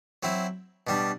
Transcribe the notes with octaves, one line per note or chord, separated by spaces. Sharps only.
F#3 C4 E4
B2 G3 D4